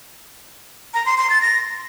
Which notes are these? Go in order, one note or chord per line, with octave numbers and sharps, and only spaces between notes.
A#5
C6
C6
A6
A#6